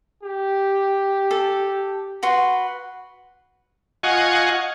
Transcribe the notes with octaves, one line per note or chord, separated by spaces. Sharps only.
G4
A4
F#4 B4 C6
F4 D#5 F#5 G#5 C#6